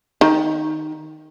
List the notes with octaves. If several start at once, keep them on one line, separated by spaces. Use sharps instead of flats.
D#3